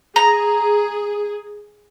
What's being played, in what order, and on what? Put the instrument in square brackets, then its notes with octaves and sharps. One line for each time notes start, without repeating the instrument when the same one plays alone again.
[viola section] G#4 [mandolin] A#5